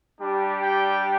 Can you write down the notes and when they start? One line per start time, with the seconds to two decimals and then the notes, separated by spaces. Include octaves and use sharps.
0.19 G3 D4 G4
0.60 G5